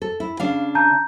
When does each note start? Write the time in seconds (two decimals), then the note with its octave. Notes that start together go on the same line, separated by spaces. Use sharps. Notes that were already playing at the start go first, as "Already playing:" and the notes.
0.02 A4
0.20 E4
0.40 C#3 D4 F5
0.75 A5 A#5 G6